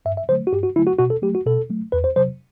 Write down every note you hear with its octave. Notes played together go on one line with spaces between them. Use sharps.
G2 E5
E5
D3 F#3 A3 C5
F#4
G2 G4
F#4
D3 F#3 A3 E4
F#4
B2 F#4
A4
F#3 A3 G4
F#4
B2 A4
F#3 A3
E2 B4
C5
C3 F#3 C5